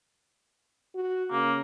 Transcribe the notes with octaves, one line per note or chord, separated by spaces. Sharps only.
F#4
C#3 A#3